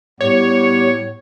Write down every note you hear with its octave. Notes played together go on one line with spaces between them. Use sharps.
A2 G3 B3 G4 C#5